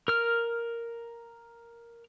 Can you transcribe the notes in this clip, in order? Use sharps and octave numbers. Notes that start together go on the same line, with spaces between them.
A#4 F6